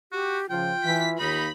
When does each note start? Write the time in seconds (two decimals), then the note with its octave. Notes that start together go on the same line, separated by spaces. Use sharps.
0.12 F#4 G4
0.50 C#3 F3 F4 G5
0.84 E3 B6
1.20 D#2 D#4 B5